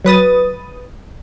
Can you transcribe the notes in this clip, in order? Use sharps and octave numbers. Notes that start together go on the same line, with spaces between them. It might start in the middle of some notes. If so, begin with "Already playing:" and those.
F#3 B4 D#6 A6